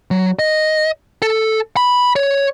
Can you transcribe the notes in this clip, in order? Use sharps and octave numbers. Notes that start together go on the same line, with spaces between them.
F#3
D#5
A4
B5
C#5